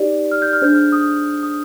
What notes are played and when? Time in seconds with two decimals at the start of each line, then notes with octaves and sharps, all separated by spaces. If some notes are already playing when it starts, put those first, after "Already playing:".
Already playing: D#4 G4 D5
0.31 F6
0.42 G6
0.53 F6
0.62 D4 G#4 C5 G6
0.75 F6
0.92 D#6
1.43 D#6